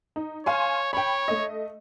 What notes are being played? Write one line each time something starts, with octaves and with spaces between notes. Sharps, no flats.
D#4
C#5 F5 G#5 C6
C#5 G5 B5
A3 D#5